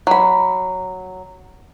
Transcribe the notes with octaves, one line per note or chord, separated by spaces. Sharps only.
F#3 B5